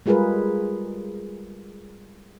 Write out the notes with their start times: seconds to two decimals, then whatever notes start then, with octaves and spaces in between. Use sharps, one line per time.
0.06 G3 G#3 F4 G#4 A#4 B4